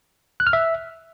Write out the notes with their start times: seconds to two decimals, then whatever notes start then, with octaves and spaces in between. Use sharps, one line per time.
0.40 F#6
0.47 F6
0.53 E5